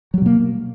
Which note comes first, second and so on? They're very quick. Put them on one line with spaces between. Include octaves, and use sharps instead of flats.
F#3 G3 B2 A#3